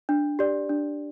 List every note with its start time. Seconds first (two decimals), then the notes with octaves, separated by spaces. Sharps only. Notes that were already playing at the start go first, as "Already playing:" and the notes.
0.09 D4
0.39 G4 D5
0.69 D4